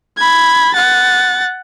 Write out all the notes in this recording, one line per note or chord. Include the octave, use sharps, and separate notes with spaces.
B5 G#6
F#5 A6